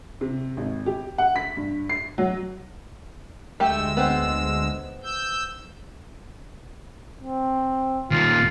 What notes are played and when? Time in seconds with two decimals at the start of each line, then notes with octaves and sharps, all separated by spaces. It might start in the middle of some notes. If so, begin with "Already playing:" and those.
0.21 C3
0.57 G#1
0.86 G4
1.18 F#5
1.36 B6
1.57 G2
1.89 C7
2.18 F#3
3.60 D2 G#3 A3 G4 E6
3.97 B3 C4
5.03 E6 G6
7.21 C4
8.11 D#2 A#2 F4